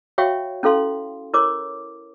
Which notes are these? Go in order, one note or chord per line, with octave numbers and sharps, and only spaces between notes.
F#4 C#5 E5 F5 G5 C#6
C#4 E4 A4 F5 C6
E4 A#4 C#5 D6